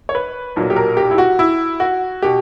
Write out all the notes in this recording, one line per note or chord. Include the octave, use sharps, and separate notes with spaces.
C#5
B4
B1 A#2 F#3
G4
A#4
G4
E4
F#4
E4
F#4
B2 G4